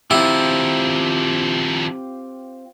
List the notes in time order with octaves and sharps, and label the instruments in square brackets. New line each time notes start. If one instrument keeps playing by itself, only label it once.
[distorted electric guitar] D#3 F3 [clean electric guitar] C4 F4 G4 [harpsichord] E4